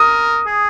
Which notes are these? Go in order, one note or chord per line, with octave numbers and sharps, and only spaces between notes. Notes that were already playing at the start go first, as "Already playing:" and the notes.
Already playing: A#4 D#6
G#4